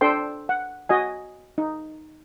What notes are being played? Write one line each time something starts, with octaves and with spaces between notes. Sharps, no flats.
D4 A4 C5 G5 C6
F#5
F#4 D#5 G#5
D#4